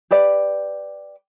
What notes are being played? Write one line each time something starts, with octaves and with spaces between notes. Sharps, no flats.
G4 B4 D5